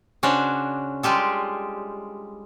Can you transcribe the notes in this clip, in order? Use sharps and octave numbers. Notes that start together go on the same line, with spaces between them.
C#3 C#4 D4 F#4 C5 D5
G3 G#3 F4 G4 A4